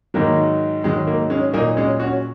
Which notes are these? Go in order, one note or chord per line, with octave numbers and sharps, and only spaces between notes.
G#2 D#3 F#3 A#3
G#2 D#3 F#3 G#3
A#3
G#3 C#4
A#2 F#3 A#3 D#4
G#3 C#4
C#4 F#4